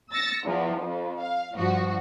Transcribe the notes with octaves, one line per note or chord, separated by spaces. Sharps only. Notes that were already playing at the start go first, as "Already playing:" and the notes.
E6 A6 A#6 C#7
E2 F3
F2
F5
G2 F3 F#4